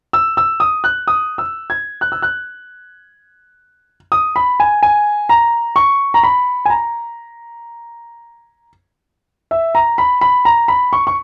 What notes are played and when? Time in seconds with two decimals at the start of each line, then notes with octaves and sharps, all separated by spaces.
0.13 E6
0.37 E6
0.60 D#6
0.84 F#6
1.08 D#6
1.38 E6
1.70 G#6
2.01 F#6
2.12 E6
2.22 F#6
4.12 D#6
4.36 B5
4.60 G#5
4.83 G#5
5.29 A#5
5.76 C#6
6.14 A#5
6.23 B5
6.65 G#5
6.70 A#5
9.51 E5
9.75 A#5
9.98 B5
10.21 B5
10.45 A#5
10.68 B5
10.93 C#6
11.07 C#6